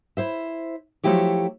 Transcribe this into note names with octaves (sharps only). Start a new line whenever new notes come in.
E4 C5 E5
F3 F#3 A3 E4 G4 C#5